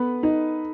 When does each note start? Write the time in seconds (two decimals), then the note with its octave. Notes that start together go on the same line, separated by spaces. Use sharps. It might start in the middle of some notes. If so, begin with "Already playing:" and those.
Already playing: B3 A4 B4
0.23 D#4